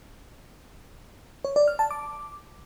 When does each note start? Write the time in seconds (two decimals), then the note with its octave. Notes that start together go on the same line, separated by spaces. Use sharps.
1.45 C#5
1.56 D5
1.68 F6
1.79 A5
1.91 D6